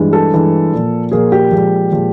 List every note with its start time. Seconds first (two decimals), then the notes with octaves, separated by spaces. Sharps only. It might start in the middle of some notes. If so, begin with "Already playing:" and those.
Already playing: G2 E3 G#3
0.13 A4
0.32 G2 E3 G#3
0.73 A#2 F3 A#3
1.12 A#2 F3 A#3 G#4
1.32 G4
1.51 A#2 F3 G#3
1.92 A#2 F3 G#3